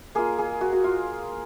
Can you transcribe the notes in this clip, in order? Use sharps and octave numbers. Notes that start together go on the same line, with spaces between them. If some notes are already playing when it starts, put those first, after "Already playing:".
A#3 F4 G#4
G#4
F#4
F#4
F4